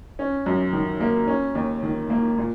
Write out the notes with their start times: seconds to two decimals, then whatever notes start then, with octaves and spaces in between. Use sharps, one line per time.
0.19 C#4
0.46 F#2
0.73 D#3
1.00 A#3
1.28 C#4
1.55 D#2
1.83 D#3
2.10 A#3
2.38 A#2